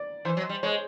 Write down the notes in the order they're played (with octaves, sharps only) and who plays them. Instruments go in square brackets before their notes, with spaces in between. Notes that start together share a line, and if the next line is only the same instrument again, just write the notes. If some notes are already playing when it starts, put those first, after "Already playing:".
Already playing: [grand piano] D5
[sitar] E3 [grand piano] C5
[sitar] F#3
G3
[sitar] G#3 [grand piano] C#5